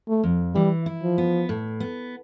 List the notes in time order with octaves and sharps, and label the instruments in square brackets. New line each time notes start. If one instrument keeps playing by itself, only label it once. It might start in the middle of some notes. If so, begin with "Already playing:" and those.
[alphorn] A3
[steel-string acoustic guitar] F2
[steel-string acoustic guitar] E3 [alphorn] G3
[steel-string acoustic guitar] E4
[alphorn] F3
[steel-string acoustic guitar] B3
A2
B3